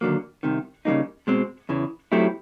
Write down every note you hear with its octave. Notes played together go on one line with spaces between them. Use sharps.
D#2 D3 F#3 A#3
C2 C3 D#3
C#3 E3 G3 A#3 D#4
B2 G#3 C4
E2 C#3 E3
F#3 A3 C4 E4 G4